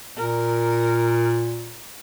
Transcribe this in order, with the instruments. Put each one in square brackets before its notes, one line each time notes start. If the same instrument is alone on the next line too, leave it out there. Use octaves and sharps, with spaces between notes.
[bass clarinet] A#2 [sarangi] A#4